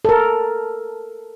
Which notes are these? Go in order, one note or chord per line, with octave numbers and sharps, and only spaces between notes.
A4 A#4